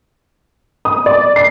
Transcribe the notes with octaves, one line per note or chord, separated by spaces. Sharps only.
D#6
D5
C7